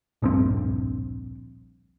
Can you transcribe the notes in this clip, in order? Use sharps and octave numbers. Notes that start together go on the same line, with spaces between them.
D1 A#1 G2 C4